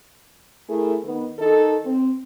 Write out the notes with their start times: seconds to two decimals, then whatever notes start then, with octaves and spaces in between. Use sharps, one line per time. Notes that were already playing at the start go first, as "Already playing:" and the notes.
0.69 A3 E4 G#4 A#4
1.04 D#3 B3
1.39 D#3 D#4 A4
1.85 C4